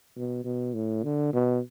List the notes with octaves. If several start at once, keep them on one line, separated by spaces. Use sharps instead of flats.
B2
B2
A2
D3
B2